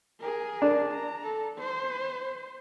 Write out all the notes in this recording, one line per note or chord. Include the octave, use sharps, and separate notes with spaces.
G#4 A#4
D4
A#5
A4
C5